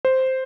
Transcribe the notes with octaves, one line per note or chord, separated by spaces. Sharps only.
C5